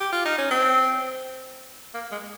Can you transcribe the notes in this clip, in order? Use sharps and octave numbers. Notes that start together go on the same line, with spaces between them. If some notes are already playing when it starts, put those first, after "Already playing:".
G4
F4
D#4
C#4
C4
A#3
G#3